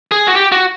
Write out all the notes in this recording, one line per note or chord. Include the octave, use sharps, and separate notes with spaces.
G#4
F#4
G4
F#4